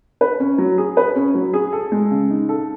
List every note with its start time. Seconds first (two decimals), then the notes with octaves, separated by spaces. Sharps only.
0.21 B4
0.40 C#4
0.58 F#3
0.78 G#4
0.97 B4
1.16 C#4
1.35 F#3
1.53 G#4
1.73 A4
1.92 G#3
2.11 C#3
2.30 D#4
2.49 A4